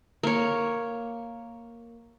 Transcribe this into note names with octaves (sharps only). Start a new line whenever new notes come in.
A#3 C#5